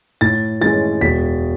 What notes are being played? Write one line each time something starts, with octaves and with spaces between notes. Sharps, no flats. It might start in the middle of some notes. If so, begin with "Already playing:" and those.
A2 A6
E3 G#3 C#4 A6
E1 B6